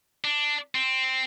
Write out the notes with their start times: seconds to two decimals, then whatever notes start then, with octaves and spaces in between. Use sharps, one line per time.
0.24 D4
0.75 C4